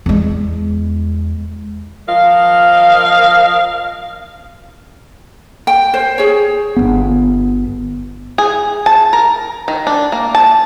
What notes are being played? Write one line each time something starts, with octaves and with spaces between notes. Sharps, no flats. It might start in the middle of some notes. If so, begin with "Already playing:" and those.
E2 G#3
F3 A#4 D#5 F5
G5
C5
G#4 C#5
G1 D#2 B3
G#4
A5
A#4
D#3
D4
A#3
A5